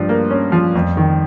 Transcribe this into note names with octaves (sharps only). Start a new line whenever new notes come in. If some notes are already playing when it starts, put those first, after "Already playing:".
Already playing: G2 F3
A#3
C#4
F3
F2
D#3